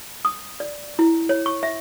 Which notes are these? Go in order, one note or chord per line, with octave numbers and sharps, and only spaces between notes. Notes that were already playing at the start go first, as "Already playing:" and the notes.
D#6
D5
E4
C#5
C#6
E5